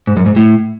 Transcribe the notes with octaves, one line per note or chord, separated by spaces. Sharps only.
G#2
F#2
G#2
A2